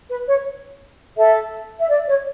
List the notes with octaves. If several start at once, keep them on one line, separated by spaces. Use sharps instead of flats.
B4
C#5
A4 E5
E5
D5
C#5